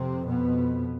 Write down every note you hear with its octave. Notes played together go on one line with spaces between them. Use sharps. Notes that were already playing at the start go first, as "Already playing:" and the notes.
Already playing: F2 C3 C4
B2 B3